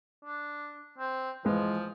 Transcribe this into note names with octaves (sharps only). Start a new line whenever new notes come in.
D4
C4
E3 F3 G#3 B4